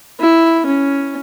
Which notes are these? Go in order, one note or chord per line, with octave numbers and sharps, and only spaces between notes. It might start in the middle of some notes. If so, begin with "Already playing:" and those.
E4
C#4